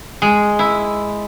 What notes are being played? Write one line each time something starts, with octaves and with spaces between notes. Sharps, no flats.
G#3
E4